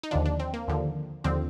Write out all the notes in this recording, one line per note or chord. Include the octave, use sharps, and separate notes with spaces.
D#4
D#2 D3 F3 D4
D4
C4
A#3
D#2 D3 F3
D#2 D3 F3 C4